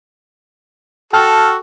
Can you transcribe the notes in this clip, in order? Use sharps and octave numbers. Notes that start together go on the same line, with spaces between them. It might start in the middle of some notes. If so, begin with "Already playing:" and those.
F#4 A4 G5 A5 F6